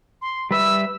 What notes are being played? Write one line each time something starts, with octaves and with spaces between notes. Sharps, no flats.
C6
G3 B4 E5 E6